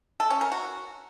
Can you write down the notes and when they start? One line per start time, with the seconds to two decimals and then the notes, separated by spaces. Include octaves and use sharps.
0.20 A4
0.30 C#4
0.41 A#4
0.52 F#4